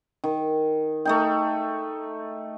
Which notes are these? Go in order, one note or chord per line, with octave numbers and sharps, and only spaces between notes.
D#3
A3 D#4 G5